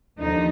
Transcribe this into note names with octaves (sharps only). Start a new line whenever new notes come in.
D#2 D3 F3 D#4